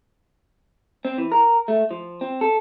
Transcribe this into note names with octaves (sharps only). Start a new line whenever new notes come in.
C4
E3
A#4
A3
F3
C4
A4